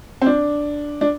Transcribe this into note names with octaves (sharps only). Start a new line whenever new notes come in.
C4
D4
D4